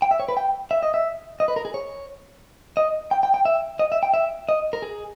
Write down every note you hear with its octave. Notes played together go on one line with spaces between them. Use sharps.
G5
E5
C#5
B4
G5
E5
D#5
E5
D#5
B4
A#4
G#4
C#5
D#5
G5
G5
G5
E5
D#5
E5
G5
E5
D#5
A#4
G#4